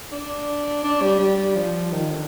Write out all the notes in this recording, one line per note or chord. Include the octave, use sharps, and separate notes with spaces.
D4
D4
G3
G3
F3
D#3
D3